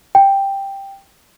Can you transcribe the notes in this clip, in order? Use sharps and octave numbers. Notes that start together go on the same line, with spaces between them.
G5